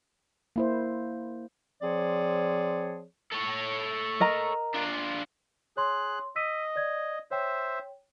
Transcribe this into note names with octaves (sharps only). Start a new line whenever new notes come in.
A#3 E4 C5
F3 C4 G#4 C#5 D5
A4 C#5
A#4 D#5 A#5
D4 F4
G#4 C#5 C6 F#6
D#5 E6 B6 D#7
D5 G#6
C5 C#5 E5 G5